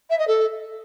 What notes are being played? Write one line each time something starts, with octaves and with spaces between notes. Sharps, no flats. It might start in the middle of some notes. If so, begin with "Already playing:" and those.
E5
D#5
A4